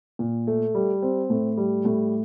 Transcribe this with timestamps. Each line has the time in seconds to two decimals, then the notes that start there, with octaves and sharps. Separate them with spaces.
0.19 A#2
0.47 A3
0.75 G3
1.02 C4
1.30 A2
1.57 G3
1.85 A2